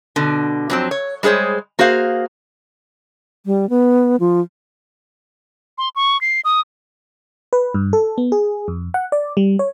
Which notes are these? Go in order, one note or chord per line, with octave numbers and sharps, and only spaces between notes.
B2 D3
F2 F#3 C4
C#5
G3 G#3 G#4 C5 C#5
A#3 F#4 G#4 C5 F5
G3
B3
F3
C6
C#6
C7
D#6
B4
G2
A4
B3
G#4
F2
F#5
D5
G3
C#5